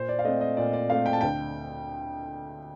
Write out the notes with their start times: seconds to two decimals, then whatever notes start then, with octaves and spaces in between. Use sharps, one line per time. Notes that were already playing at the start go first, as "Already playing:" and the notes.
Already playing: A#2 C5
0.09 D5
0.19 F5
0.25 A3 C4 D#5
0.41 D#5
0.57 A#2 D5
0.73 D5
0.89 A3 C4 F5
1.06 G5
1.13 A5
1.21 D2 G5